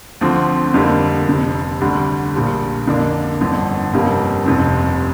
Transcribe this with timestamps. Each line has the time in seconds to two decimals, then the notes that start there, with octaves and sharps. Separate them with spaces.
0.21 D2 D3 F3 C4
0.74 F2 D3 G3 A#3
1.27 F1 F2 C3
1.81 D2 D3 G3 D4
2.34 A#1 A#2 G3
2.87 F2 D3 A#3 D4
3.41 G1 F2 D3
3.93 G1 F2 C3 G3 A#3
4.46 F1 F2 C3